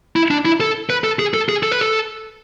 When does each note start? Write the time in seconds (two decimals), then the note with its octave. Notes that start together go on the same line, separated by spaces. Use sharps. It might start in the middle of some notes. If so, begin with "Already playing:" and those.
0.16 E4
0.31 D4
0.45 E4
0.60 A4
0.90 B4
1.04 A4
1.19 G#4
1.34 A4
1.49 G#4
1.63 A4
1.72 B4
1.80 A4